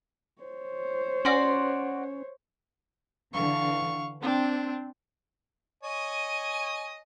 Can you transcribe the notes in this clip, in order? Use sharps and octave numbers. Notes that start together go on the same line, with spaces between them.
C5 C#5
C#4 F#4 D5 C6
D3 E3 F5 C#6
C4 D4
C#5 D#5 G#5